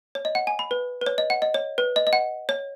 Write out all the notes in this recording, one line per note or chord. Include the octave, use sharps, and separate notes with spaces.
C#5
D#5
F#5
G#5
B5
B4
B4
C#5
D#5
F#5
D#5
C#5
B4
D#5
D#5
F#5
C#5